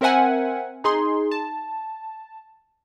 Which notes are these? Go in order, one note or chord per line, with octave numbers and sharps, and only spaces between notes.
C4 A#4 C5 E5 F#5 G#5
D#4 G#4 C6
A5